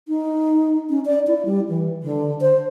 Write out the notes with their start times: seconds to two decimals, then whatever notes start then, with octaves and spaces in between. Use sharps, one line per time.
0.08 D#4
0.90 C#4
1.05 D5
1.27 E4
1.45 G3
1.69 E3
2.03 D3
2.41 C5